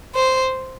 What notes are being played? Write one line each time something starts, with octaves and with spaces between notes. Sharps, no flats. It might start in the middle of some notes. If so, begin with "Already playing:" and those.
C5